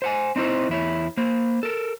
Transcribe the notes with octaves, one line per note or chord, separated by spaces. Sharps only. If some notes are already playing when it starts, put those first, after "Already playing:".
C5 F#5 G#5
C4 D#4 E4 C5
E2 E4 C#5
A#3 C5
A4 A#4